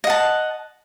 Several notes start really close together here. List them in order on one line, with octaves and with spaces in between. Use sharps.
D#5 F#5 A5